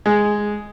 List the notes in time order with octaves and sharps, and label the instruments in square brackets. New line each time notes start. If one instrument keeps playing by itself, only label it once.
[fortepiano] G#3